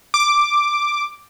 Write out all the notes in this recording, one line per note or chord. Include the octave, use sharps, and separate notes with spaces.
D6